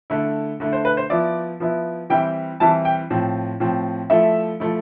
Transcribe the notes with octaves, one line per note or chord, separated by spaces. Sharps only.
D3 A3 E4
D3 A3 E4
C5
B4
C5
F3 B3 E4 D5
F3 B3 E4
E3 G3 C4 E4 G5
E3 G3 C4 E4 A5
G5
A2 F3 C4
A2 F3 C4
F3 A3 E4 E5
F3 A3 E4